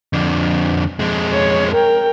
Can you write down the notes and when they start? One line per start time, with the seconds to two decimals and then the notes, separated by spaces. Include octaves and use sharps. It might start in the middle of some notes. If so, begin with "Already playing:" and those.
0.13 F2 D3
0.99 F2 G#3
1.31 C#5
1.71 A#4 G5